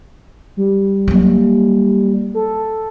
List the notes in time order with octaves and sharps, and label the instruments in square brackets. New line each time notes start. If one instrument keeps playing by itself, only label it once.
[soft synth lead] G3
[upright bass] F#3 A#3
[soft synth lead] A4